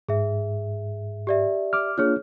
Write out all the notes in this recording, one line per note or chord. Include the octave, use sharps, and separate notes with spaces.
G#2 G#4 E5
G4 D5 E5
D6 F6
A#3 D4 F4 G#4 C#5 F6